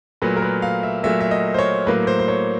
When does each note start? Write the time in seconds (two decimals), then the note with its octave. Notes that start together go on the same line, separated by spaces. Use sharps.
0.22 A#2 F#3 A3 B4
0.37 A#4
0.42 B4
0.62 F5
0.83 E5
1.03 A#2 F#3 A3 E5
1.20 E5
1.31 D#5
1.54 C5
1.59 C#5
1.87 A2 F#3 A#3 B4
2.07 C5
2.20 C5
2.28 C#5